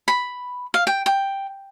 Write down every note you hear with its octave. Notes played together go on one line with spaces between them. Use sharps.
B5
F5
G5
G5